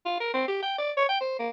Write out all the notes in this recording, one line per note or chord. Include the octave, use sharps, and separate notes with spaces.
F4
A#4
C4
G4
G5
D5
C#5
G5
C5
A#3